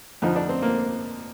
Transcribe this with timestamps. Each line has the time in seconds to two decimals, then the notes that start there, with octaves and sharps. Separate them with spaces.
0.22 F2 D3 F3 D#4
0.36 D4
0.49 C4
0.62 A#3